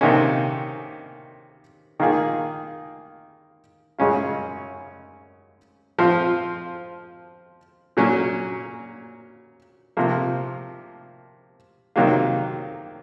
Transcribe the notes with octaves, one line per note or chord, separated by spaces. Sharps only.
C3 D#3 A#3 C#4
D#3 A#3 F4 G#4
F#2 C#3 G#3 C#4 F4
F3 C4 F4
A#2 F#3 C#4
C3 F3 A#3
C3 D#3 F#3 A#3 F4